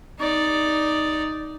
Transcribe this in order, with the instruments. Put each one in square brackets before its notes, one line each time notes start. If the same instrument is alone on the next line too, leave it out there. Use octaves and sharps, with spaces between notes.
[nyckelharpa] D#4 D5